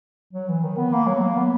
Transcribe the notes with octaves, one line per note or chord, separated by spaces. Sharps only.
F#3
E3
D#3
B3
A#3
F#3
A#3
B3